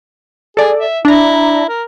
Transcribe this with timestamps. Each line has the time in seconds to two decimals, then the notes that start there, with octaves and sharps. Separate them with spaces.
0.57 G#4 A4 D5
0.79 E5
1.05 D4 E4 A#5
1.69 A#4